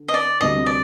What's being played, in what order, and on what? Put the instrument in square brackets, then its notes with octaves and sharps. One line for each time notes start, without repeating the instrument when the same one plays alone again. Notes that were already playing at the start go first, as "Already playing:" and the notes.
Already playing: [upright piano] D3
[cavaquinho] D#5
D5
[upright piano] D2 C3 G3 [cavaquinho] D#5
[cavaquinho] D5